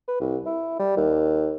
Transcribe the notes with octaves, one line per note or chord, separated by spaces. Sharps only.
B4
C2
E4
G3
D#2